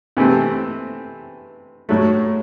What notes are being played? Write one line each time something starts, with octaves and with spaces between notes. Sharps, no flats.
C3 E3 A3 C4
A2 F#3 A3